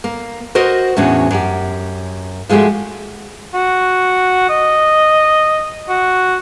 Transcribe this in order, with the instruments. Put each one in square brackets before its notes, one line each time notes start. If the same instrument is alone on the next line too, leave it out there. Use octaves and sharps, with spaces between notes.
[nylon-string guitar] A#3
F#4 A#4 C5 D#5
E2 A2 C#4 D4 F#4
F#2 G4
F3 G#3 A3 F#4 G4
[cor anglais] F#4
D#5
F#4